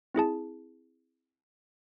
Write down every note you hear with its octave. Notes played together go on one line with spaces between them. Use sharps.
C4 E4 G#4 A5